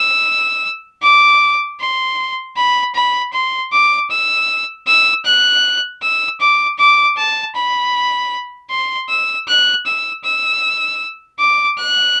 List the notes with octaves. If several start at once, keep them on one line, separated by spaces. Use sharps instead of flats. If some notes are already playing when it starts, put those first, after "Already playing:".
Already playing: E6
D6
C6
B5
B5
C6
D6
E6
E6
F#6
E6
D6
D6
A5
B5
C6
E6
F#6
E6
E6
D6
F#6